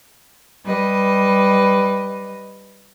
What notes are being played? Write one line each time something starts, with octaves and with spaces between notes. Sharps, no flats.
G3 B4 D#5